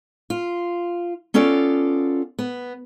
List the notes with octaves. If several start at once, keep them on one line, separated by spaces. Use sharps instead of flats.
F4
B3 C#4 F4 A4 D5
B3